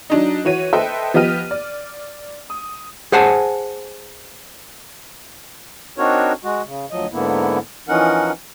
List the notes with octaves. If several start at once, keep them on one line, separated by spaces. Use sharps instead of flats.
F#3 D4 D#4
E3 F#4 C#5 D#7
A4 B4 C5 D#5 E5 G5
F3 B3 G4 D#5 F6 D#7
D5
D#6
G#4 C5 F#5 G#5 A5
C4 D4 D#4 F#4 A#4 C#5
G#3 F#4
C#3
D2 F3 F#3 D#5
G#2 D3 A#3 B3 E4
E3 F3 C#4 D#4 A#4 F#5